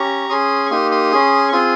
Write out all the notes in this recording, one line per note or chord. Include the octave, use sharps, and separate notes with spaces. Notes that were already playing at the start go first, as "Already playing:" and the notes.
Already playing: C#4 G4 A#5 C#6
C#4 G#4 C6 D#6
C#6
A#3 D#4 G4 C6 D#6
C6 D#6
C#4 G#4
C#6
C4 F4 G#4 C6 D#6